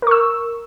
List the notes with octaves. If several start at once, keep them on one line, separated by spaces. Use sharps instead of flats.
A#4 C#6 E6